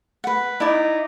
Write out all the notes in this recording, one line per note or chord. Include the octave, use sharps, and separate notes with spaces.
B4 F#5
D#4 E4 D5